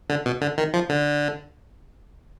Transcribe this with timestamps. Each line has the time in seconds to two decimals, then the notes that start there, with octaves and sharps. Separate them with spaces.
0.10 D3
0.26 B2
0.41 D3
0.58 D#3
0.74 F3
0.89 D3